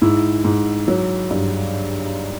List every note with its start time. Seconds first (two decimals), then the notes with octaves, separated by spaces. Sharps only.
0.02 G#2 E4
0.45 G#2
0.88 F#3
1.31 G2